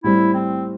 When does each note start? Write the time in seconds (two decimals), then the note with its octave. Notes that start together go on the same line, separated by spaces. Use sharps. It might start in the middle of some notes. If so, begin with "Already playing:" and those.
0.04 A2 G3 C4 E4
0.34 C4